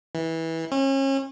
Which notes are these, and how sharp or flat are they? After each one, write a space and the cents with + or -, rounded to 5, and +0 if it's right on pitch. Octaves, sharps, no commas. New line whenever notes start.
E3 -20
C#4 -35